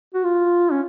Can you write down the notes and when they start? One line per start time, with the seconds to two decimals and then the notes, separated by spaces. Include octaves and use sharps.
0.14 F#4
0.24 F4
0.72 C#4